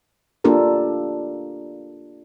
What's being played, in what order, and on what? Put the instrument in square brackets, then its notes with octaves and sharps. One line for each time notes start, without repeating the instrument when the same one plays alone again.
[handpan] A#3 D4 F4 G4 A4 A#4